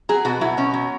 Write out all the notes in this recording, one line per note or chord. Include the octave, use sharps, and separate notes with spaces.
F#3 G#4
B2 F#4
F#3 E4
B2 C#4
F#3